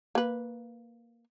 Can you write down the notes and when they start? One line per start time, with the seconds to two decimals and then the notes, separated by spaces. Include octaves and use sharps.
0.15 A#3 B4